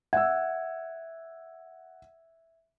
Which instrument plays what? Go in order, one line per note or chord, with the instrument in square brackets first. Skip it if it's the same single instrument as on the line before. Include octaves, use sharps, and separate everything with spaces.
[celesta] E5 G#6 [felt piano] F#5 E6